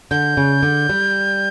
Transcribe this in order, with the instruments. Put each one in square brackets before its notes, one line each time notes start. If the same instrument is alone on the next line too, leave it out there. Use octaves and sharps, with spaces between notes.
[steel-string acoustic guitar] D3 [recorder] G6
[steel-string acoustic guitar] C#3
D3
G3